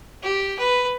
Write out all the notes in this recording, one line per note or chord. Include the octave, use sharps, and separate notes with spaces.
G4
B4